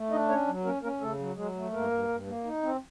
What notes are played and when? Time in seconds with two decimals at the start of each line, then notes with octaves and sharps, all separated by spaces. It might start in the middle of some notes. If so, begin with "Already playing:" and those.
Already playing: A3
0.11 D4 D#4 D#5
0.29 C#4 C#5
0.47 F#3
0.64 A#3 C#4 A#4
0.82 A#3 C#4 A#4
1.00 C#3 A3 A4
1.19 F#3
1.36 F#3 G#3 G#4
1.55 A3
1.73 G2 A#3 A#4
1.91 G2
2.08 G2
2.27 A#3
2.44 D#4
2.63 C4